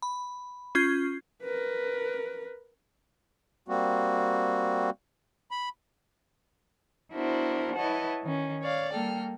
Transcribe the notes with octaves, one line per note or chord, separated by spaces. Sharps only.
B5
C#4 F4 G6 G#6 C7
A#4 B4
G3 A#3 C4 F#4
B5
B3 D4 E4 F#4 A#4 C5
E4 B4 C#5 D#5 F#5 A5
D#3 C#4
C#5 D5 F5
G3 A#3 A4 G5 F6